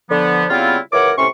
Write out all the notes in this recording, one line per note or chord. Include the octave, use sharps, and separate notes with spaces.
D3 F3 B3
C#3 G3 B3 C4 E4 F4
C#2 E3 A#4 C#5 F#5 D6
A2 C3 C#4 C6 C#6